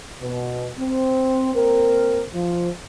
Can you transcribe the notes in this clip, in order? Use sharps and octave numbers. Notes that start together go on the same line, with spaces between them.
B2
C4
A#3 C4 A#4
F3